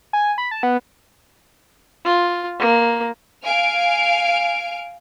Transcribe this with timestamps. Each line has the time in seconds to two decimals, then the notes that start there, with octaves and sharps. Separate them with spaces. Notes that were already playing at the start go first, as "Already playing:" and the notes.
0.13 G#5
0.38 B5
0.51 A5
0.63 B3
2.05 F4
2.59 A#3
3.44 F5 G#5 F6 D7